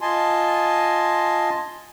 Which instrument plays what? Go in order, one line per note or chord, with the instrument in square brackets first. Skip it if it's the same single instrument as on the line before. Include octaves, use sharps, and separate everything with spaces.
[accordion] F4 D#5 G#5 A5 C6